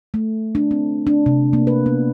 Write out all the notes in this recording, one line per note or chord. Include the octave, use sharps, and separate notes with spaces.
A3
D4
C4
D4
C3
A#3
B4
B3